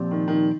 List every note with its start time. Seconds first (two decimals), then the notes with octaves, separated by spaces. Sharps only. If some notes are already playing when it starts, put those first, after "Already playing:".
Already playing: A#2 F3 C4 G4 D5
0.11 D#3
0.28 D#3